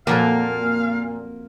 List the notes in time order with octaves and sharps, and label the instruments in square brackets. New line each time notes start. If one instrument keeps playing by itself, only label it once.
[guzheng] F2 F#3 A4 [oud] A#2 [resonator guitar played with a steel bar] A#3 [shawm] F5